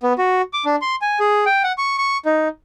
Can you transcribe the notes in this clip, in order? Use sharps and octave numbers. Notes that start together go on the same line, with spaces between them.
B3
F#4
D6
D4
C6
G#5
G#4
G5
F#5
C#6
C#6
D#4